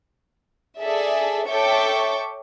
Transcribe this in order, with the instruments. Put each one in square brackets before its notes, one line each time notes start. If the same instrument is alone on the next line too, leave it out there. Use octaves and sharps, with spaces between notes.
[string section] G#4 A4 D5 E5
A4 C#5 E5 G5 C#6 D6